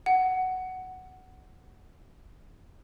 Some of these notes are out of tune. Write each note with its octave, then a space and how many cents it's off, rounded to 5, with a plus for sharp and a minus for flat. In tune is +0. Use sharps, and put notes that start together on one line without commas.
F#5 +10